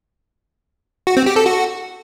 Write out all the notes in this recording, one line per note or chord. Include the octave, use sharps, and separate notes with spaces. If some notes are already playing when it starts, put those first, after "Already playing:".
F#4
C4
G4
A4
F#4